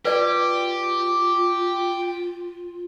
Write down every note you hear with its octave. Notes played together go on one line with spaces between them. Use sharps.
F4 G4 B4 D5